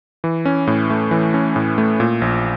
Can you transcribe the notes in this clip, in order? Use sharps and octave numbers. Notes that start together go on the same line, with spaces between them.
E3
C#4
A2
A3
E3
C#4
A2
A3
A#2
A#1